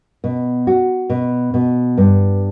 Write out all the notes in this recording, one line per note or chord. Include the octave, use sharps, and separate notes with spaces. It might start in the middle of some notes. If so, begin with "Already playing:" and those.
B2
F#4
B2
B2
G2